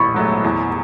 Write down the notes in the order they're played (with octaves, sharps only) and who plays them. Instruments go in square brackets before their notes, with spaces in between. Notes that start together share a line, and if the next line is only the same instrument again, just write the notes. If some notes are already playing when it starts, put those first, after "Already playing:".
Already playing: [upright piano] A1 [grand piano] B5 C#6
[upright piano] G#2 F#3 A3
E2